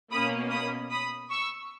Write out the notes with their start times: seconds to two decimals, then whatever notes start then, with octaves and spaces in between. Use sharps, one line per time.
0.11 B2 A#3 C#4 B5 D#6
0.51 B5 D#6
0.90 B5 D#6
1.30 C#6 E6